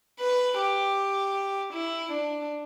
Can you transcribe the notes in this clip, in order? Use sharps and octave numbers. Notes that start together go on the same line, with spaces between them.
B4
G4
E4
D4